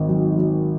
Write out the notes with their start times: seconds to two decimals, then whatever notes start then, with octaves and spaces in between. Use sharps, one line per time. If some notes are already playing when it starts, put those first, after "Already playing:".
Already playing: G#1 D#3
0.09 F#3
0.38 F#3